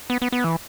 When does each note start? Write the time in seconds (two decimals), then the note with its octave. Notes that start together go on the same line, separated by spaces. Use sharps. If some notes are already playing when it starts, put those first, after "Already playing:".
0.10 B3
0.22 B3
0.32 B3
0.44 E3